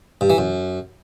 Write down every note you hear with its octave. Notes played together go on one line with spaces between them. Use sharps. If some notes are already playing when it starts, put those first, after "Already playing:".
G2
E3
F#2